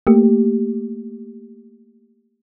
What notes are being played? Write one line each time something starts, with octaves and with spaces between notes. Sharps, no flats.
A3 A#3 G4